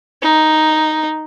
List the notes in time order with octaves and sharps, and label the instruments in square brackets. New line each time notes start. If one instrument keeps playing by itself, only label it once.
[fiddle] D#4